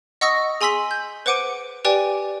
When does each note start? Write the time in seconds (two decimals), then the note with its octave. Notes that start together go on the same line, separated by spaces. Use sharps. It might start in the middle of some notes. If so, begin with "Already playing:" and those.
0.21 D#5 F#5 C#6 D#6 E6 A#6
0.61 G#4 G#5 C6 E6 B6 F#7
0.91 G6
1.26 B4 C5 F#5 D6 D7 D#7
1.85 G4 B4 D5 G5 G#5